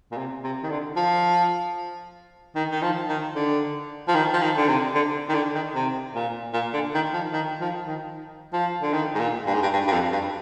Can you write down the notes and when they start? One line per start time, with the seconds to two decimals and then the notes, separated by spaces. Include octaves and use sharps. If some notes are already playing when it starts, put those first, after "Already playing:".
0.12 A#2
0.17 C3
0.44 C3
0.63 D#3
0.70 D3
0.96 F3
2.56 D#3
2.71 D#3
2.82 F3
3.09 D#3
3.35 D3
4.08 F3
4.15 D#3
4.33 F3
4.42 D#3
4.57 D3
4.68 C3
4.95 D3
5.29 D#3
5.35 D3
5.55 D#3
5.75 C3
6.15 A#2
6.54 A#2
6.74 D3
6.94 D#3
7.14 F3
7.33 D#3
7.61 F3
7.87 D#3
8.53 F3
8.82 D3
8.93 D#3
9.15 G#2
9.19 A#2
9.46 G2
9.54 G#2
9.62 G2
9.73 G2
9.88 G2
9.92 F2
10.12 G2